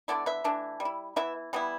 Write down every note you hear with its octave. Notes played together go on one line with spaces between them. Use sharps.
D3 B3 E4 A4 D5
B4 E5
E3 A3 D4
G3
E4
E3 B3 E4 B4 E5
E3 G3 B3 E4